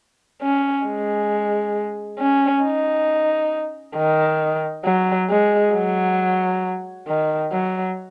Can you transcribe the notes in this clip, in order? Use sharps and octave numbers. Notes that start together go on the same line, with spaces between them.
C#4
G#3
C#4
D#4
D#3
F#3
G#3
F#3
D#3
F#3